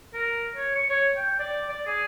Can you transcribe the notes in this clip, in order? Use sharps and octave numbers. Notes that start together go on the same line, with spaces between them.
A#4
C#5
C#6
C#5
G5
D5
D5
G#4